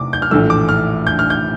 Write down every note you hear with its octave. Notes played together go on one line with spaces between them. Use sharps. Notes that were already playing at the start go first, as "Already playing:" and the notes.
Already playing: E2 C3 A3 D6
G6
F6
A#1 A2 E3 A3 E6
D6
F6
G6
F6
G6